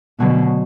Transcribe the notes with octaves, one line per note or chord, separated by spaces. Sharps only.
B2 D3 F#3 A3 C#4 F#4